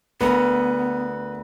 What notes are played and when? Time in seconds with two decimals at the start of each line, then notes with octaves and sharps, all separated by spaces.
0.21 D2 B3 A#4 B4